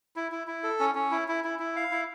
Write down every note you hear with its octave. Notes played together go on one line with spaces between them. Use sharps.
E4
E4
E4
A4
C#4
C#4
E4
E4
E4
E4
F5
E4